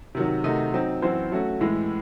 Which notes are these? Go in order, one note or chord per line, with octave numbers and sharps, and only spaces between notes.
C3 D#3 F#3
C3 D#3 A3 D#4 F#4
F#3 C4 D#4
F#2 E3 C4 F#4 C5
F#3 A3 C#4 F#4
A2 E3 G#3